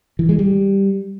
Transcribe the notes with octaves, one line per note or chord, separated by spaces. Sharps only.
E3
G#3
G3